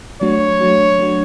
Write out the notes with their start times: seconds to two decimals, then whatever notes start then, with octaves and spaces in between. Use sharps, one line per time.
0.21 F#3 A3 D4 F#4 C#5
0.61 F#3 A3 D4 F#4
0.99 F#3 A3 D4 F#4